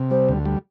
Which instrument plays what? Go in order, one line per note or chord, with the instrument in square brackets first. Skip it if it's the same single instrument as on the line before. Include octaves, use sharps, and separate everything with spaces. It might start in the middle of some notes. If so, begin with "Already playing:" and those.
Already playing: [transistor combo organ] C3
[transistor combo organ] G3 [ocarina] C5
[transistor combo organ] D2
G3